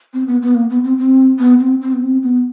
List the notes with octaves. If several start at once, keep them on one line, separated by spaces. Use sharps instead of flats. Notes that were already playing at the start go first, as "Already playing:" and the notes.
C4
B3
B3
A#3
B3
C4
C4
B3
C4
C4
B3
C4
B3